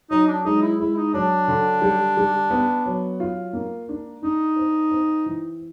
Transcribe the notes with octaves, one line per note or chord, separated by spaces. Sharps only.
F#3 D#4
D4
G#3 D#4
E4
G#3 E4
D#4
F#3 D4
D3
G3
G3
B3
F#3
F4
A#3
D4
D4 D#4
C4
C4
E3